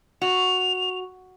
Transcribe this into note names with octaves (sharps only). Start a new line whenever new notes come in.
F#4 F7